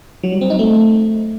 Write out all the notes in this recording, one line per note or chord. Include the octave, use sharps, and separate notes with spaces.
F#3
G3
C4
D#4
A3